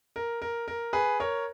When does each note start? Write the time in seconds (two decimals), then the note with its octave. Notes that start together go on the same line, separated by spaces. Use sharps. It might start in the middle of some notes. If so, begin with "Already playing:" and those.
0.16 A#4
0.42 A#4
0.68 A#4
0.93 G#4 B4
1.20 A#4 C#5